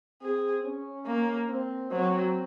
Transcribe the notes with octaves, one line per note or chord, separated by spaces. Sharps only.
C4 G#4
C#4
A#3
C4
F#3 C4